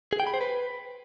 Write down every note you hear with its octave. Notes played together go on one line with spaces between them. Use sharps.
G#4
G5
B5
C5
B4